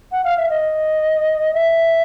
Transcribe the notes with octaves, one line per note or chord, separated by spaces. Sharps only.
F#5
F5
E5
D#5
E5